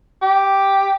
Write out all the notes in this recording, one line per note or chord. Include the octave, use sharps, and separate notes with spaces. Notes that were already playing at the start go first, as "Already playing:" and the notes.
G4